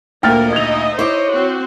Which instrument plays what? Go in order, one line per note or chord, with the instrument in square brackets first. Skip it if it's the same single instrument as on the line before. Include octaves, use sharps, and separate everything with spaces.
[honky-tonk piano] D2 A#2 [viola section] A#3 A#4 [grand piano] G5 F6 A6
[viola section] D#4 D#5 E5 [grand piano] G#6 F7
[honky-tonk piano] E4 D6 [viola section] C5 D#5 [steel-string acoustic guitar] C#5
[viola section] C4 F#4 C5